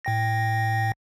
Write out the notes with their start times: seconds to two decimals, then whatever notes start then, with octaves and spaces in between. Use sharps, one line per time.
0.05 A2 G5 A#6